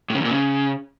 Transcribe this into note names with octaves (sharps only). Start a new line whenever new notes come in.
A2
C#3
E2
A#2
C#3